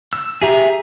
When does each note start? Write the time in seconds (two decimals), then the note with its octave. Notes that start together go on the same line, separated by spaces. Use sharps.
0.13 E6
0.42 G4 G#4 E5 A#5